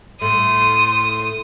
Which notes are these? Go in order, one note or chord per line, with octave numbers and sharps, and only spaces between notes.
A2 C6 D#6